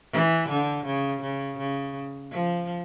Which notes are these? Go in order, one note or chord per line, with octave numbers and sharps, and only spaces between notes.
E3
D3
C#3
C#3
C#3
F3